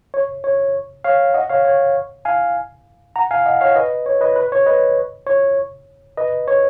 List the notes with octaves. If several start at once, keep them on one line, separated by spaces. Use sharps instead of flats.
C#5
C#5
C#5 F5
D#5 F#5
C#5 F5
C#5
F5 G#5
F#5 A#5
F5 G#5
D#5 F#5
C#5 F5
B4 D#5
C#5
B4 D#5
B4
C#5
B4 D#5
C#5
B4 D#5
C#5